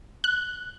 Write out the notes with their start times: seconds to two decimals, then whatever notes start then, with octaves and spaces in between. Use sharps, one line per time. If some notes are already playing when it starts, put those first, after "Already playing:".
0.24 F#6